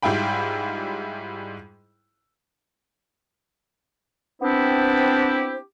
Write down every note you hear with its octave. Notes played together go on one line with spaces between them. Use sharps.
G#2 G3 E4 F4 G5 B5
B3 C4 D4 E4 G4 C5